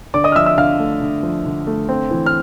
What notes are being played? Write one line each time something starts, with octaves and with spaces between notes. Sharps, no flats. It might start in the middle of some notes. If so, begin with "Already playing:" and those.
D3 D5 D6
D#5 D#6
F6
F3 E5 E6
E5 E6
D3 F5 F6
A3
D3
F3
D3
A3
C4
E3
F6